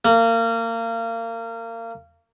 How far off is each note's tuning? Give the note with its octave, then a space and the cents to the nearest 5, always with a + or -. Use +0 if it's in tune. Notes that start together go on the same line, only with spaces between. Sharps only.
A#3 -30